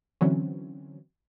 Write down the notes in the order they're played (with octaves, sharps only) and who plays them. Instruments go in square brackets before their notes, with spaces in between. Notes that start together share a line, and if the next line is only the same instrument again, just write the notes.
[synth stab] D3 E3 F#3 C4 C#4